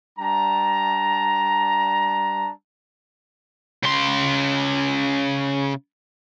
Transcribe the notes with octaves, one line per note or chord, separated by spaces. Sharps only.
G3 D4 A5 A#5
C#3 C6